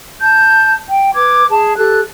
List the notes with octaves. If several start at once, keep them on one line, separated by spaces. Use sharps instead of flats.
A5 G6
G5
B4 D6 G#6
G#4 A5
G4 A4 F#6